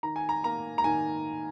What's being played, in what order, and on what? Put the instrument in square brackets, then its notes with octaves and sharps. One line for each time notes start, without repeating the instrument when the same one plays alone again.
[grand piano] D#3 A#5
G#5
A#5
A#3 A#5
A#5
D#3 G#5